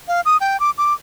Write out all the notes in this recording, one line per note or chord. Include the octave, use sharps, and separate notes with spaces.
F5
D#6
G5
D6
D6